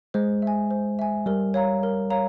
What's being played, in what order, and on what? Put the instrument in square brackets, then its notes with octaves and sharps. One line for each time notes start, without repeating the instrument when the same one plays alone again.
[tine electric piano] G#3 [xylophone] C5
[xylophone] E5
G#5
C5
E5 G#5
[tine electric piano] G3 [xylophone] A#4
[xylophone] C#5 F5 A#5
A#4
C#5 F5 A#5